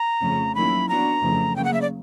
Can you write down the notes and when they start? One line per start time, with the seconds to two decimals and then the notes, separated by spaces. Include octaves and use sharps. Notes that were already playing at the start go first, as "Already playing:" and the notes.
Already playing: A#5
0.21 F2 C#3 F3 A3 C#4
0.55 D#3 F#3 A#3 C#4 E4 B5
0.89 F#3 B3 D4 F#4 A#5
1.22 F2 C#3 E3 A3
1.56 C#3 F#3 A#3 G5
1.65 F#5
1.74 E5
1.82 D5